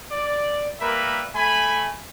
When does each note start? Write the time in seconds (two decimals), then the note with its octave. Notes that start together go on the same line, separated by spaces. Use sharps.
0.11 D5
0.80 G3 A#3 A#4 B4 E5 B5
1.35 A3 G#5 B5